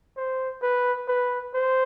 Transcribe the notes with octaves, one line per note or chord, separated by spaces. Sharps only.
C5
B4
B4
C5